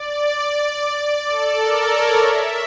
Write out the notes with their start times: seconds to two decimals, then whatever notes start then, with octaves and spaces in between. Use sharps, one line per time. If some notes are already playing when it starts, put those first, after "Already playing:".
Already playing: D5
0.98 D5
1.28 A4
1.58 A#4
1.88 C#5
2.18 E5